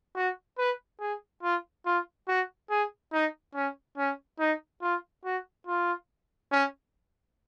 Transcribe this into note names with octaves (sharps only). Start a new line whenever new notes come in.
F#4
B4
G#4
F4
F4
F#4
G#4
D#4
C#4
C#4
D#4
F4
F#4
F4
C#4